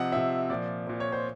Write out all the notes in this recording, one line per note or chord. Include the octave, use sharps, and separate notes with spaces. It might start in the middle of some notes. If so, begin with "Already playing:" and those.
Already playing: C3 F3 D#5 F#5
C3 F3 E5
A#2 F3 D5
A#2 F3
C#5
C5